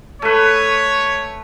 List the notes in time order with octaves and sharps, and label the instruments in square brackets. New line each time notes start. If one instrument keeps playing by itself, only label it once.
[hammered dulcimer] A3 B4 [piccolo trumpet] C#5